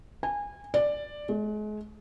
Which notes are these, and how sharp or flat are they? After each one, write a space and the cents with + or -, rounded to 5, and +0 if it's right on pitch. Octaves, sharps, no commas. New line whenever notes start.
G#5 -25
D5 +5
G#3 +35